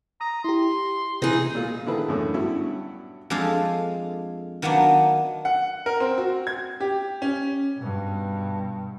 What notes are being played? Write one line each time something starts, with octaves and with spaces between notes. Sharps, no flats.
A#5 D#6
E4 G4 C6
C3 E3 D#4 G#4
A#2 G#3 F4 G#4
D3 D#3 E4 G#4 B4
F#2 A2 D3
G2 B3 C#4 E4 F#4
F2 G#3 D4 G#4 A4 F5
D#3 F#3 A#3 B3 D4
F#5
A#4
C4
F#4
G#6
G4
C#4
G2 B2